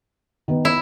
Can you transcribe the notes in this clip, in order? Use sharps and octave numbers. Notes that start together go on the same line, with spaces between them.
D#3 B3
E4